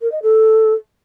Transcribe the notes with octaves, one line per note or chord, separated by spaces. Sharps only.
A#4
D#5
A4